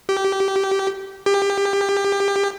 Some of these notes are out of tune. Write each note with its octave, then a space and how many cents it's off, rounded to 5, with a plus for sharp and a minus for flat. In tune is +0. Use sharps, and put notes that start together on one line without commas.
G4 -15
G4 +25